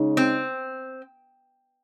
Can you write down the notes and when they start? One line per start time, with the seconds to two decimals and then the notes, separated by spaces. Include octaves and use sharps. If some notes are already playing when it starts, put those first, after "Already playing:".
Already playing: C#3 G#3 D#4
0.17 C4